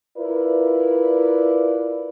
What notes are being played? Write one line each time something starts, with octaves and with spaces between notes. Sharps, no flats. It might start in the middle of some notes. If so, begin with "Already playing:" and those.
E4 F4 A#4 B4 D5